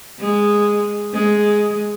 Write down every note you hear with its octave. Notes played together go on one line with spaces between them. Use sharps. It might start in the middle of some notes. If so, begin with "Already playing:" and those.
G#3
G#3